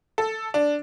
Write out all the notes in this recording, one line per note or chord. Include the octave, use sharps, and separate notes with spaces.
A4
D4